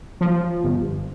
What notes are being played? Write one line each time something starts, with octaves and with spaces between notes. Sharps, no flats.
F3
G1